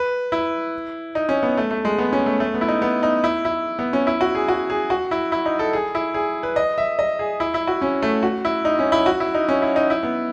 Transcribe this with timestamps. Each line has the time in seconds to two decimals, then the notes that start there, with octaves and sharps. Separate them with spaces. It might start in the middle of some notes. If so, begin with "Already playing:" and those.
Already playing: B4
0.32 E4
1.15 D#4
1.29 C#4
1.43 B3
1.57 A3
1.71 A3
1.85 G#3
1.98 B3
2.13 C#4
2.26 A3
2.40 A3
2.54 B3
2.61 E4
2.68 D#4
2.82 B3
3.03 D#4
3.24 E4
3.45 E4
3.79 B3
3.93 C#4
4.07 E4
4.21 F#4
4.35 G#4
4.49 F#4
4.70 G#4
4.90 F#4
5.11 E4
5.32 E4
5.46 D#4
5.59 A4
5.73 G#4
5.95 E4
6.14 G#4
6.43 B4
6.56 D#5
6.78 E5
6.99 D#5
7.19 G#4
7.40 E4
7.54 E4
7.67 F#4
7.82 C#4
8.02 A3
8.23 F#4
8.45 E4
8.65 D#4
8.79 C#4
8.92 E4
9.06 F#4
9.20 E4
9.34 D#4
9.49 C#4
9.62 E4
9.76 D#4
9.90 E4
10.03 B3